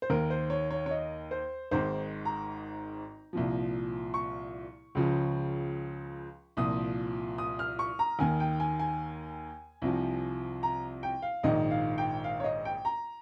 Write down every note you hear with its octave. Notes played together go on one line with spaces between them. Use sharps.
C5
D#2 D#3 A#4
C5
C#5
C#5
C#5
D#5
C5
G#1 G#2 D#3 C5
A#5
C2 A#2 F3
C#6
C#2 C#3 F3
C2 A#2 F3 D#6
D#6
F6
C#6
A#5
D#2 D#3 G#5
G5
G#5
G#5
C2 C3 F3
A#5
G5
F5
A#1 G#2 D#3 D#5
F5
G5
F5
C#5
D#5
G5
A#5